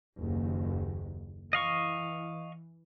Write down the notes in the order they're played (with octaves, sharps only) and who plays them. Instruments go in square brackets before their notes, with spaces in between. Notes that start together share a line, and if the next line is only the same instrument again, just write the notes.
[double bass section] F#1 D#2
[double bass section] E3 [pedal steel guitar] D#5 F5 C#6